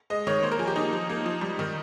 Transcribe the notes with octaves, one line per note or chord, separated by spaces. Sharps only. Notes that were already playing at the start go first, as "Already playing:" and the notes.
G#3 D#5
D#3 C#5
A#3 C5
A#4
F3 G#4
G4
A#3 D#4
F3
A#3
F3
G3
D#3